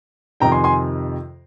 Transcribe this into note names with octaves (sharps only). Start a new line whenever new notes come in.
F2 C3 D#3 G5 A#5
G#5 C6
G#5 C6